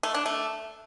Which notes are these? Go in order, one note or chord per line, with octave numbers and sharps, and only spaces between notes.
A3
D4
A3